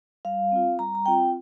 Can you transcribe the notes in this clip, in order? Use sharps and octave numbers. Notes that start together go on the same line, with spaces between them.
G3 F5
C4 F4
G3 A#5
A#5
C4 F4 G5